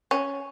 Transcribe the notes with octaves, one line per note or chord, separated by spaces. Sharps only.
C#4